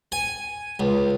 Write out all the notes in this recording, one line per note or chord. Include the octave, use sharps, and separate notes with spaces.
G#5
C#2